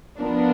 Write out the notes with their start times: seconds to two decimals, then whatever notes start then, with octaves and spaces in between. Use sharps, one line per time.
0.20 F3 B3 D4 F4 A#4